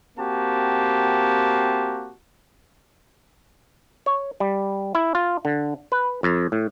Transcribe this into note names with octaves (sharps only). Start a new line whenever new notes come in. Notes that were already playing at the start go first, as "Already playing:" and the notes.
A#3 C4 F#4 G4 A5
C#5
G3
E4
F4
D3
B4
F2
A2